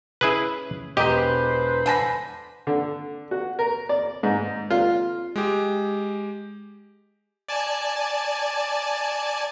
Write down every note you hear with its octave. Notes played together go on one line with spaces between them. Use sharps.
C#4 E4 G#4 B4
E1 G4 B4 C5 D#5 A#5 B6
D3 G#5 A5 B5 A#6
D3
F#4
A#4
D5
G#2
F4
G#3 G4
D5 G#5 A5